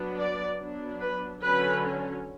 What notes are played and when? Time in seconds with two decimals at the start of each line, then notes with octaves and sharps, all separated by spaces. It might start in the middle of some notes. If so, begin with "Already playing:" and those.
Already playing: F#3 B3 D4
0.18 D5
0.59 F#3 B3 D4
1.00 B4
1.42 D3 F#3 C#4 B4